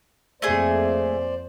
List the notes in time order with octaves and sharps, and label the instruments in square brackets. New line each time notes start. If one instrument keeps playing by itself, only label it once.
[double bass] F2 A#3 [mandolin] A3 G#4 [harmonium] C5 D5